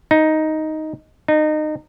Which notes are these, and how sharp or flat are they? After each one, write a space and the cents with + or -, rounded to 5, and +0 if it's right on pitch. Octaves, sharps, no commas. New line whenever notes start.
D#4 +5
D#4 -25